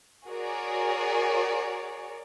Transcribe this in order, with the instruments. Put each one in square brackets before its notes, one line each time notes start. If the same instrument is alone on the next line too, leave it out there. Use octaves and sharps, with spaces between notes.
[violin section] F#4 G#4 A#4 C#5 D5